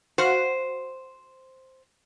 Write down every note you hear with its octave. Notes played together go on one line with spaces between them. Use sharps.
F#4 C5 F5 F#5